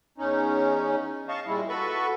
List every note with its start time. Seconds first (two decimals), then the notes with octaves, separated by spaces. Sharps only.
0.18 E2 C#4 D#4
1.29 D#5 F5 A5 C#6
1.47 A#2 G3 G#3 E4
1.69 F#4 A4 B4 B5 C#6